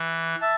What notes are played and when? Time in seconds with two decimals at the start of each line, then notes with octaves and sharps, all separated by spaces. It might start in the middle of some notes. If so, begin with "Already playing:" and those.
Already playing: E3
0.41 E5 A5